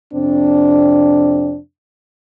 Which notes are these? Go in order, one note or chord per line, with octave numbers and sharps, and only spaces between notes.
F2 C3 C4 D4